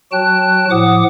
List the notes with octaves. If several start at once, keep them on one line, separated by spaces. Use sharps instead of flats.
F#3 F#4 G5 A5 F#6
A2 F3 F#5 D6 D#6